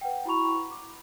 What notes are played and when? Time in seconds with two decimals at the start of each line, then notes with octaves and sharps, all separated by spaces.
0.01 B4 F#5 G5
0.25 E4 F#4 A#5 B5 C#6 F7
0.71 D6